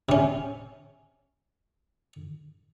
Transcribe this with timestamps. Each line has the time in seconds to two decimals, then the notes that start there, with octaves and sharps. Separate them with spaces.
0.09 C3 C#4